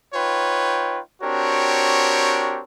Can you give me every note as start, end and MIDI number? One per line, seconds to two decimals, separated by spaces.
0.14 0.99 63
0.14 0.99 65
0.14 0.99 71
0.14 0.99 73
0.14 0.99 79
1.22 2.61 60
1.22 2.61 62
1.22 2.61 66
1.22 2.61 67
1.22 2.61 70
1.22 2.61 73